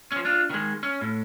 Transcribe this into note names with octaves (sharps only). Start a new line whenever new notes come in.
F3 C#4
D4 F4
D#3 G#3
C#4
A2